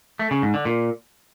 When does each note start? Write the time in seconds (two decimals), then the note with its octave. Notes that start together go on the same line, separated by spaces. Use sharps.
0.19 A3
0.31 C#3
0.42 G#2
0.54 D3
0.65 A#2